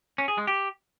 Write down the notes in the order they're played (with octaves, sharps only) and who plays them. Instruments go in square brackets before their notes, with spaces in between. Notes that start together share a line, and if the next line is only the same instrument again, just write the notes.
[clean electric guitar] C#4
G#4
G#3
G4